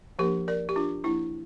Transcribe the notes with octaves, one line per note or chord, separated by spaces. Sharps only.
F3 A#3 D4 G4 A#4
A#4 D5
G4
D4 F4
F3 A#3 D4 E4